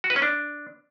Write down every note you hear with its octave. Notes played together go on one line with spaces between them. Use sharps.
F#4
B4
C#4
D4